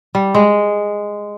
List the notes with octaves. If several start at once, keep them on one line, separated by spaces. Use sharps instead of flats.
G3
G#3